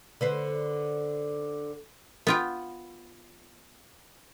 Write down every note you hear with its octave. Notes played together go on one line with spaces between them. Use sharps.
D3 B4 C5
B3 F4 G5